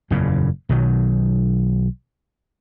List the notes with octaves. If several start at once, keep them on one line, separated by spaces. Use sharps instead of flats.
F#1 E2 A#2 C#3
B1 D#3 F#3